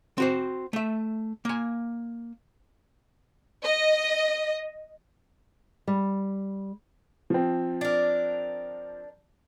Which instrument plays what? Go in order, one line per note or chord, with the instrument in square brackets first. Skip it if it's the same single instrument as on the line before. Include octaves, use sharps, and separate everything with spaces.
[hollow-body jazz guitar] C4 F#4 C5
A3 E5
A#3 G#5
[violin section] D#5
[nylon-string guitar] G3
[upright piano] F3 C4
[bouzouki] D4 A#4